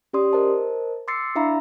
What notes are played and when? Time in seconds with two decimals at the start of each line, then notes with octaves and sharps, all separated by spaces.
0.13 C#4 G4 D5 C6 D#6
0.33 A#4 C5 D#5 A5
1.08 C6 D6 E6 A6 C7 C#7
1.35 D4 E4 E5 F5 A#5 B5